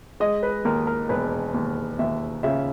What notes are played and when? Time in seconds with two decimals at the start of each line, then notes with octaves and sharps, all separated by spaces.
0.20 G#3 D#5
0.43 B4
0.65 D#2 A#4
0.87 A#4
1.09 E1 B4
1.54 D#2
1.99 D#2 E5
2.43 C#3 E5